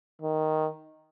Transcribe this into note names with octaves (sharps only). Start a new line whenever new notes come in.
D#3